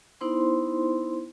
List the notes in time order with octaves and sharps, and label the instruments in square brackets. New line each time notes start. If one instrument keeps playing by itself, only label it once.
[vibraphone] B3 D#4 E4 C5 C6